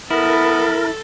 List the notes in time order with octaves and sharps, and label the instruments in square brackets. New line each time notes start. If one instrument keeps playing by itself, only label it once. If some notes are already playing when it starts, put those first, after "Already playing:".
[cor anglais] B3 [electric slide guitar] E4 [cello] A4 [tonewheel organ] A#4